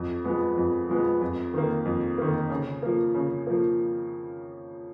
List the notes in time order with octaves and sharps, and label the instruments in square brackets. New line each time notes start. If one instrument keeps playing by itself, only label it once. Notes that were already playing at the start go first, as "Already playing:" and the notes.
Already playing: [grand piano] F2
F3 G#3 B3
F2
F3 G#3 B3
F2
D#3 A#3
F2
D#3 A#3
C#3
F3 A#3
C#3
F3 A#3